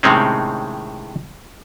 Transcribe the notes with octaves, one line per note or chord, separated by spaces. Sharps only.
A2 C3 D#3 G#3 C4 C#4